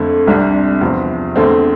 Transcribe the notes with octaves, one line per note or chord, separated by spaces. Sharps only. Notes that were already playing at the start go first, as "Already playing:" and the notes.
Already playing: F2 D3 A3
C2 C3 G3 D4
E2 C3 F3 C4
E2 D3 A3 C4